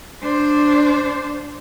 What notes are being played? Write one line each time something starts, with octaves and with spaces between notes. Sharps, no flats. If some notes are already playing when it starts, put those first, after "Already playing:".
D4 C5